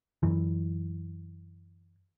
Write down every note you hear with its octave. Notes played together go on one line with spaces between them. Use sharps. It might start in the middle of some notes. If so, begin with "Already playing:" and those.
F#2 E3